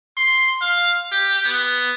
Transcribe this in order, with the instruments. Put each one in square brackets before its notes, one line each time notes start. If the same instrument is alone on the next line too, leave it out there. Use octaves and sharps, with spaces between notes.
[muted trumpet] C6
F5
G4
B3